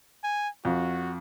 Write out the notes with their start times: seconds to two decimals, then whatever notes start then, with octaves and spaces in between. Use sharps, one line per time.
0.24 G#5
0.65 F2 F#4